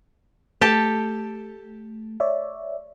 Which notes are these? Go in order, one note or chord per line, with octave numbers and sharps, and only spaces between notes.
A3 G4 A4 A5
C#5 D5 E5